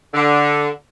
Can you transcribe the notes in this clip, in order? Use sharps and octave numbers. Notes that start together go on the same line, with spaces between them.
D3